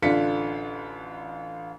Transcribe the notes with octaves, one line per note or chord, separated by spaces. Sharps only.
A1 D3 D4 F4 B6 C#7